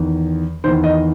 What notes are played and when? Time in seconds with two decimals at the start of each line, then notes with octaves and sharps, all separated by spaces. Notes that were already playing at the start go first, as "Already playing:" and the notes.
Already playing: E2 D#3
0.64 D#3 C5
0.67 E2
0.84 D#5